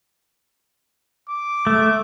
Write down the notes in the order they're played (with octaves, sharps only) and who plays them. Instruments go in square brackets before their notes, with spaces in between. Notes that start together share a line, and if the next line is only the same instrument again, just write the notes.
[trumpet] D6
[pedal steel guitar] A3